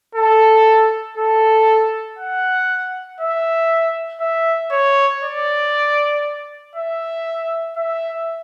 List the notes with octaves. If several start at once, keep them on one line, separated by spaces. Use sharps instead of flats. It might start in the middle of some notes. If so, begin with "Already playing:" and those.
A4
A4
F#5
E5
E5
C#5
D5
E5
E5